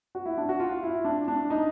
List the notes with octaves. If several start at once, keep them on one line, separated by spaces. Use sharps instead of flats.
F#4
E4
D4
F#4
F4
E4
D4
D4
D#4